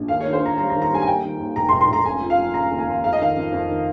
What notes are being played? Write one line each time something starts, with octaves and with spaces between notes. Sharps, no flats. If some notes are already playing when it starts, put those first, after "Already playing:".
Already playing: A#1
D#2 F5
C#5
D#3
C5
D#3 A#5
G3 A#5
A#5
D#3
A#5
G3 G#5
G#5
D#2 G5
D#3
D#2
F1 A#5
C6
F1
C6
F1 A#5
C#3 G#5
F3
F5
F3
C#3 A#5
D#2
G#5
D#2
F2 F5
D#5
D#3 F5
F2
F2
D#3